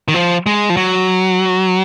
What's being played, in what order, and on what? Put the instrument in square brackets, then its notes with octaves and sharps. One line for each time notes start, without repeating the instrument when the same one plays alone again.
[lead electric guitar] D#3
F3
G#3
F3
F#3